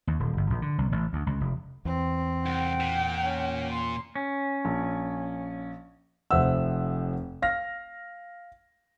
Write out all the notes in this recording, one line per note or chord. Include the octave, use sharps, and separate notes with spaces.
D#2
D#1
G1
A#1
D3
C2
A1
D2
C#2
F1
E2 C4
C2 F#5 G5
A#2
C#4
C6
C#4
A#1
F1 C5 E5 F#5 E6
F5 F6 A#6